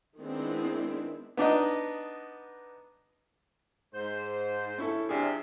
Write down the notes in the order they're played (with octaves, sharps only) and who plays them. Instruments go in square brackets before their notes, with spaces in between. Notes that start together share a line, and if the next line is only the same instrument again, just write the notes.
[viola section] D#3 G#3 B3 C4 D4 E4
[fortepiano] B3 D4 D#4 D#5
[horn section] G#2 C5
[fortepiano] C#4 E4 A4
[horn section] C3 F3 [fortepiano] D4 G#4